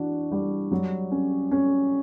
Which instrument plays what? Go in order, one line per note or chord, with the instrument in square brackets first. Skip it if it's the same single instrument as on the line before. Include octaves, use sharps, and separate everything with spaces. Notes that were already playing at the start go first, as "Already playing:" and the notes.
Already playing: [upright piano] E3 D4 F#4
G3
F#3
C#4
C#4